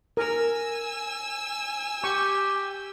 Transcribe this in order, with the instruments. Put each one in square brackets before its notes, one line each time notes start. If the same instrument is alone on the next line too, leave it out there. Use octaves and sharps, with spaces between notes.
[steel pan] A#4 [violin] G#5 E6
[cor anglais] G4 [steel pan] C#6